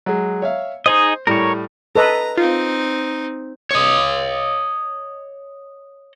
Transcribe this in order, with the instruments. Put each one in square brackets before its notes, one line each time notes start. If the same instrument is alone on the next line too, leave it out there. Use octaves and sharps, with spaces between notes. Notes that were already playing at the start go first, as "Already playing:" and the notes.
[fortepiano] F#3 G#3
C#5 E5 F5
[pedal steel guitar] D#4 G#4 D#5 [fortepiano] C5
[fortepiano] A2 G3 [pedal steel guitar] A#4 C#5
[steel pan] A4 B4 D#5 [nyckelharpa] A#5
[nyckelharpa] C4 D#4 [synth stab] F4
[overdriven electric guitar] C#5 D#5